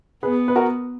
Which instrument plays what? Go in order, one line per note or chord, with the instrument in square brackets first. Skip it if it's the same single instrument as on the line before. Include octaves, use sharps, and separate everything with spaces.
[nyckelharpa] B3 [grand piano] G#4 B4
[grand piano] B4
F#4 A#4